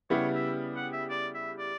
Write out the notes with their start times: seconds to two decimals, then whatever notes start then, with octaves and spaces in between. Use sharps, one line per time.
0.10 C#3 G3 B3 E4 G4 C#5
0.35 E5
0.76 F#5
0.93 E5
1.10 D5
1.34 E5
1.59 D5